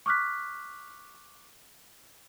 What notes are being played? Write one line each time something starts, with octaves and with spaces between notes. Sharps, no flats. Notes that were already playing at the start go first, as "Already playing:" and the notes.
C#6 D6 F6 F#6 B6